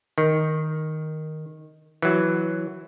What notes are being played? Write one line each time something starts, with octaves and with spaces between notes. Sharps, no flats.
D#3
E3 F#3